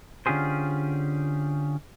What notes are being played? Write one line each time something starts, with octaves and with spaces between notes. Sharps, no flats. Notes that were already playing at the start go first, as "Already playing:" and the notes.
D3 C#4 F4 G4 G#4 C5